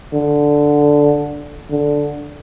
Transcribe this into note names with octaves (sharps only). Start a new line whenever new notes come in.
D3
D3